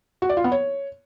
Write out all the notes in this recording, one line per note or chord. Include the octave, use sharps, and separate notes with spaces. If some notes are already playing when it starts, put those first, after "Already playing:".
F#4
D5
F4
B3
C#5